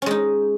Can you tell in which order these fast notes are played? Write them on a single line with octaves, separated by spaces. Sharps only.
C#4 G#3 D#4